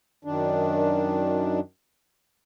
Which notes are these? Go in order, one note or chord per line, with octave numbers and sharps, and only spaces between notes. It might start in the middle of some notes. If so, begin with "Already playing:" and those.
F#2 D#3 D4